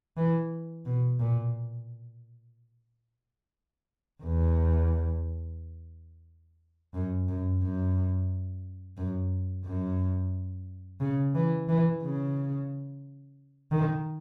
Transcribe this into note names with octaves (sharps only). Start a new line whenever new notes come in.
E3
B2
A#2
E2
F#2
F#2
F#2
F#2
F#2
C#3
E3
E3
C#3
D#3